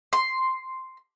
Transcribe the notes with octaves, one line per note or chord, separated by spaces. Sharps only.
C6